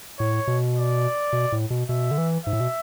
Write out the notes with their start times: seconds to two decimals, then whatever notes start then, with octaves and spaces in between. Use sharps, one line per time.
0.19 A2 C#5
0.47 B2
0.77 D5
1.33 B2
1.52 A2
1.70 B2
1.89 B2 E5
2.11 D3
2.18 E3
2.46 G#2 E5
2.53 A2
2.60 B2